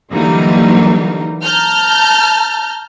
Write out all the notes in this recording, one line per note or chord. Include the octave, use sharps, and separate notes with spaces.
D3 E3 F#3 G3 A#3 D#4
A5 A#5 F6 G6